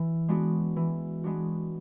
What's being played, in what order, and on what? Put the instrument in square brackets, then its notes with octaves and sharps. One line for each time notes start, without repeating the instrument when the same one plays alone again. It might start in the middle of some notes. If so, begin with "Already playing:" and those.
Already playing: [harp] E3
G#3 B3 D4 F#4
E3
G#3 B3 D4 F#4